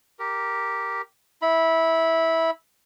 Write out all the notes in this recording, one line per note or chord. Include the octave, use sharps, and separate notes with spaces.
G4 A#4
E4 B5